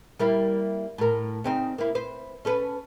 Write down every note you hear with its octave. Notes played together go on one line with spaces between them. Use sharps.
G3 A#3 E4
A2 A#4
C#3 C4 D#4
A#3 E4
B4 C5
C#4 A4 B4